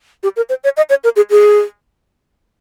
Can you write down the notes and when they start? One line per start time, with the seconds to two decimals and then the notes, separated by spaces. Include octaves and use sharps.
0.23 G4
0.36 A#4
0.49 C5
0.64 C#5
0.77 D#5
0.89 C#5
1.04 A#4
1.16 G#4
1.30 G#4